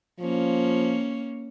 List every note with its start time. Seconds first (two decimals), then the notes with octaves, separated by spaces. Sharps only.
0.20 F3 A#3 C#4